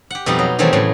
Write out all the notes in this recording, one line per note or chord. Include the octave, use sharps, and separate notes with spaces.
G4 F#5
F2 B2 G3 D#4 F#5
F#3
D#3 E3 F#3 G3 A3 C4
A2 C#3 E3 F#3